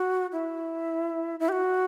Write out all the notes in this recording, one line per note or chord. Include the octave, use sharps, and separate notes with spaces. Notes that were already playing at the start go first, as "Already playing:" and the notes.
Already playing: F#4
E4
E4
G4
F#4